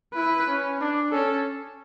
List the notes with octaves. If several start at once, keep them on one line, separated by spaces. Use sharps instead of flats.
E4 B4
C#4
D4
C#4 A4